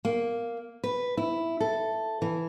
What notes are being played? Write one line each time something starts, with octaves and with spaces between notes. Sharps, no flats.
A#3
B4
E4
A4
E3